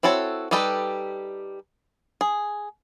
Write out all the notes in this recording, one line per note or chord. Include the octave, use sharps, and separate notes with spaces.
C4 E4 F#4 A4 C#5
G3 D#4 G4 A4 B4
G#4